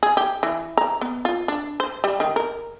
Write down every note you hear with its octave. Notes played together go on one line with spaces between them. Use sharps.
G#4
G4
E3
A#5
B3
F4
D4
C5
G3
D#3
A#4